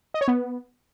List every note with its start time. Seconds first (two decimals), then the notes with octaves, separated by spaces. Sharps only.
0.14 D#5
0.21 C#5
0.28 B3